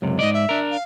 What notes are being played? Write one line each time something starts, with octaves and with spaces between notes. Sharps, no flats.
C#2 F#2 C3
G#2 D5 D#5
E5
D4 A#4
F5